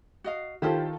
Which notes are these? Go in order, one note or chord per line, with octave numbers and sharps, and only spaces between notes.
F#4 D#5 F5
D#3 E4 F4 G4 A4 C5